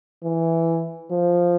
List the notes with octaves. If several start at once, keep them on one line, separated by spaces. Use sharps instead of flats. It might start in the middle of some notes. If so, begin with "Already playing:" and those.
E3
F3